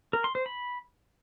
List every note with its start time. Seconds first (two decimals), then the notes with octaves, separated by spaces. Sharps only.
0.13 A#4
0.24 C6
0.35 C5
0.46 B5